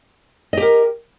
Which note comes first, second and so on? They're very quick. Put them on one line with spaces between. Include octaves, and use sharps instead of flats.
D#5 G4 A#4